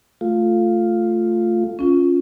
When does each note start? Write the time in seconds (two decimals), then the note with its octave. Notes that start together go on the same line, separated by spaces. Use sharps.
0.21 A3 F4
1.79 C#4 F4